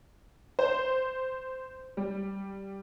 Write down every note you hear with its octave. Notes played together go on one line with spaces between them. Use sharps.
C5
G3